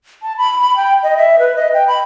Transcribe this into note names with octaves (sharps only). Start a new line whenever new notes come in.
A5
B5
B5
G5
D#5
E5
B4
D#5
G5
B5